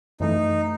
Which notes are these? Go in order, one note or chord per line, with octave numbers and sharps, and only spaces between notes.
F#2 E3 A3 D#4